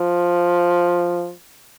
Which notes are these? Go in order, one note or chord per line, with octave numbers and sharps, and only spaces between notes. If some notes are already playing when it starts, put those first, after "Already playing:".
Already playing: F3